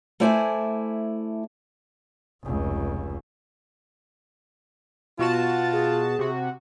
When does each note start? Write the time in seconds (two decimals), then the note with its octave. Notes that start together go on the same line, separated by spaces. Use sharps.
0.20 A3 E4 C5 D5 E5 G#5
2.43 F1 C#2
5.19 B2 F4 F#4 A5
5.72 G#4
6.19 C3 F#4